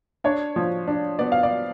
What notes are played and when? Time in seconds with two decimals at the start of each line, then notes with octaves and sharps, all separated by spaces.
0.24 D4 C#5
0.56 F3
0.87 D4
1.19 B3 D5
1.32 F5
1.43 D5